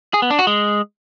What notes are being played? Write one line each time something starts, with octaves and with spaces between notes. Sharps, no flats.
G#4
B3
D4
F#4
G#3